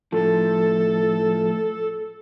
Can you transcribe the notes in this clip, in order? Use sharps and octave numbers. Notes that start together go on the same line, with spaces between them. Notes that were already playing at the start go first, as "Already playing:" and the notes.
A2 F3 A4